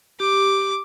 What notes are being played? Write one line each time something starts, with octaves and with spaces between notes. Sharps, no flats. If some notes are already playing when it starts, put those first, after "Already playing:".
G4 D6